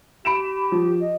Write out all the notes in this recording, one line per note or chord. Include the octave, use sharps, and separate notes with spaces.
G4 B5 D7 E7
F3
D#5